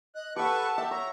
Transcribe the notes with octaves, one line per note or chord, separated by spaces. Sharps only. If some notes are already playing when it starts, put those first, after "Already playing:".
D#5 F#6
G4 A4 B4 F#5 A5 C#6
G4 E5
C#5 A#5